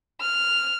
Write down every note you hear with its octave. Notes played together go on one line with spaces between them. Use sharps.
F6